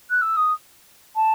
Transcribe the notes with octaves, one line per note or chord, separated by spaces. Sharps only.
F#6
E6
D#6
A5